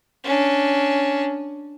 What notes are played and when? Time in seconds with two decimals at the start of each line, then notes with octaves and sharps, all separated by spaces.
0.24 C#4 D4